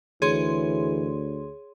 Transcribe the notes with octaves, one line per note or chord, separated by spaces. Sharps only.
D2 E3 G#4 C#5 C6